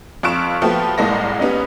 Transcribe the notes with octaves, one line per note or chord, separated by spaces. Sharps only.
F2 F4 C#6 F#6 D7 E7
F3 A3 B3 F#4 G4
C2 A2 G#3 A#3 A#6
G3 B3 C#4 D#4